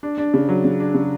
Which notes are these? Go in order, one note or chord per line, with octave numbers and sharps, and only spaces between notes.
D4
D4
C#3
F#3
C#3
D4
C#3